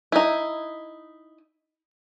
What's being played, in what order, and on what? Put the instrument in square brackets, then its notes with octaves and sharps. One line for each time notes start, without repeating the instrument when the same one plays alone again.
[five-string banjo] D#4 E4